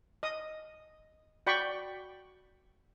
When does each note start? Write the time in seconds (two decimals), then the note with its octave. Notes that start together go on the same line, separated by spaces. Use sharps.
0.23 D#5 D#6
1.47 F#4 D5 G5 B5 C#6